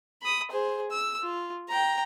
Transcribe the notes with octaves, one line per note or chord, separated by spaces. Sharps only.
B5 D#6
G#4 C5
E6
F4
G5 A#5